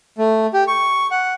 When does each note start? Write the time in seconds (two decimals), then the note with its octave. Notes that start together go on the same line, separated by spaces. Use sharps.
0.18 A3
0.54 G4
0.68 C#6
1.11 F#5